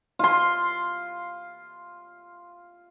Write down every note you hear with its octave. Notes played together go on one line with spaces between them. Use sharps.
F4 C6